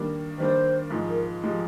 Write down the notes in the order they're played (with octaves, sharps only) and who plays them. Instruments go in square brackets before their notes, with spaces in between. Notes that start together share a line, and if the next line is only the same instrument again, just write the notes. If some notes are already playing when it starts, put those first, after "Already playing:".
Already playing: [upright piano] D#3 G3 A#3 D4
[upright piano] D#3 G3 A#3 D4 [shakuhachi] C5
[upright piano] G#2 F3 G#3
[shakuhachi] A#4
[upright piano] F3 G#3 [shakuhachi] G4